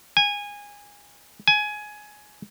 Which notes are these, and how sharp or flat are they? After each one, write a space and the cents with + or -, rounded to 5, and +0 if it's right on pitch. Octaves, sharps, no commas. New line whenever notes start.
G#5 -20
G#5 +15